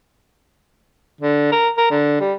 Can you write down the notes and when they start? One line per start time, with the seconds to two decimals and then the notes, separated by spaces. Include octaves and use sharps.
1.21 D3
1.52 A#4
1.77 A#4
1.91 D3
2.20 G3